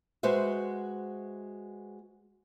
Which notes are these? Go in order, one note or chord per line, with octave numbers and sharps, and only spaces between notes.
G#3 F#4 B4 C5 E5